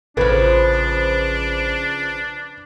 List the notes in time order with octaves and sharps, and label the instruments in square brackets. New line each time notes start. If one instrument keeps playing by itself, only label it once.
[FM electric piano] A1 [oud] C#3 F3 [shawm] D4 [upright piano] B4